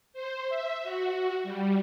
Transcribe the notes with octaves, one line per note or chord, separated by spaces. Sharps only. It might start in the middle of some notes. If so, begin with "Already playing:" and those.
C5
E5
F#4
G3